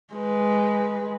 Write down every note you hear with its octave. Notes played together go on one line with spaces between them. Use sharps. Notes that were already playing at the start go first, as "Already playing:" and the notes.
G#3 B4